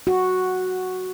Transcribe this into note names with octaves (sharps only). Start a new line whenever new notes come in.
F#4